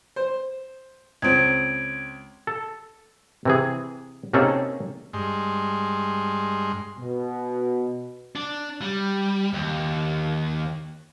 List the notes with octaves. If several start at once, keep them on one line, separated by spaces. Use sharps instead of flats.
C5
C#2 C4 G#6 D7
A4
C3 E3 G#4
C3 A#3 C#4 D#4 G#4 A4
G2 G#3 C6
B2
D4
G3
D#2